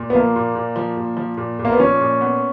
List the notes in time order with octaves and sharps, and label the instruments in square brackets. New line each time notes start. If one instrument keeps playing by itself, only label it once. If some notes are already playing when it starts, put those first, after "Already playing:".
Already playing: [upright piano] A#2
[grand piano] B3
[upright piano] F3 [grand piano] A#3
[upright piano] A#2
A#2
F3
A#2
F3
A#2
A#2
[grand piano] A#3
B3
[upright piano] F3 [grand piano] C#4
[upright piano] A#2
B3